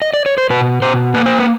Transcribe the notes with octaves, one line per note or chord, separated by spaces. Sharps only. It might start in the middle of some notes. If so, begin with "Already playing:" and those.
D#5
D5
C#5
C5
B2 B4
B2 C5
A#3 B4
C5
B4